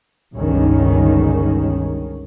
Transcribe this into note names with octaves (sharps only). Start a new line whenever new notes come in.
G1 C#2 G2 D#3 C#4